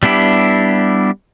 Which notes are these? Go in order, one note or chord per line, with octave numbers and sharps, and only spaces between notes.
G3 B3 D4 E4 G4